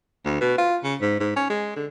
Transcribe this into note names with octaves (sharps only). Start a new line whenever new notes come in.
D2
B2
F4
C#3
G#2
G#2
C#4
G#3
D3